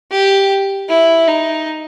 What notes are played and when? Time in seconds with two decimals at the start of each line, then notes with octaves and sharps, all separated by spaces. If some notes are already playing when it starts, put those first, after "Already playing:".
0.11 G4
0.89 E4
1.28 D#4